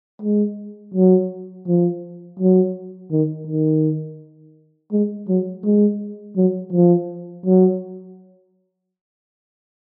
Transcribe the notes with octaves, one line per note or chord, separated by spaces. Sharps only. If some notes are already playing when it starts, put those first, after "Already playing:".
G#3
F#3
F3
F#3
D#3
D#3
G#3
F#3
G#3
F#3
F3
F#3